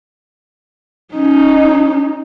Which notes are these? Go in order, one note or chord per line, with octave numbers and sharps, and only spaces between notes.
C#4 D#4